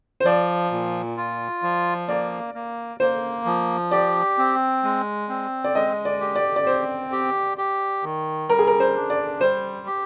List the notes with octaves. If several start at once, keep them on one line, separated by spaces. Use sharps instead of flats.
C5
F3 D5
A#2
F4
F3
A#3 D5
A#3
A#3 C5
F3
G4 D5
C4
G#3
C4
D5
G#3 D#5
D5
G4
D5
D5
C4 C5
G4
G4
D#3
G3 A#4
G#4
A#4
C5
D4
D5
G3 C5
G4